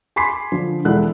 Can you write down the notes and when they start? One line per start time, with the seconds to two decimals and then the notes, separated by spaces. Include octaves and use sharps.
0.16 G#5 B5 C6 D6 B6 C7
0.52 D3 F3
0.85 E1 G#3 E4 A4 F#5 F#6